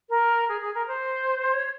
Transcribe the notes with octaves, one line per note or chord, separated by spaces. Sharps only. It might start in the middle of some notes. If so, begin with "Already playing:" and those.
A#4
G#4
G#4
A#4
C5
C#5